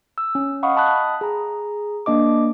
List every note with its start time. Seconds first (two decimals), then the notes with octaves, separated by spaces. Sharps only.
0.18 E6
0.35 C#4
0.63 D#5 F5 F#5 B5 C#6 D#6
0.75 D#5 F#5 A5 B5 D#6 F#6
1.21 G#4 A#5
2.06 A#3 D4 D#5 D6